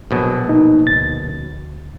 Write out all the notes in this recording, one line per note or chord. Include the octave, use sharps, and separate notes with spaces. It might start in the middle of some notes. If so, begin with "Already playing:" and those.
A#1 B2 F#3
A#3 D#4
D2 A6